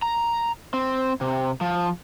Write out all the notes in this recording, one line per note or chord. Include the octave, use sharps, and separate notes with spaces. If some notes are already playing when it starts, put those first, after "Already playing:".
A#5
C4
C3
F3